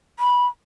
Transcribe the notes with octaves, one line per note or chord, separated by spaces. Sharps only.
B5